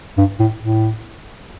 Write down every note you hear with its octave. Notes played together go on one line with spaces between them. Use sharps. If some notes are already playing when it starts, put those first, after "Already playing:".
G2
A2
A2